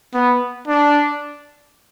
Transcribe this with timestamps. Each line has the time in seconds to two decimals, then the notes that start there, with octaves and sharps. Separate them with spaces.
0.14 B3
0.68 D4